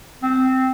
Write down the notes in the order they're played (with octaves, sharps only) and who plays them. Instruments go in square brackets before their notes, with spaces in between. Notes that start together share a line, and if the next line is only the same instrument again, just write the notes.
[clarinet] C4